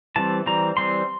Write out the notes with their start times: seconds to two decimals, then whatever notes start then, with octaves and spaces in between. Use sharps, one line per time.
0.16 E3 G3 C4 A5
0.46 E3 G3 C4 A#5
0.77 E3 G3 C4 C6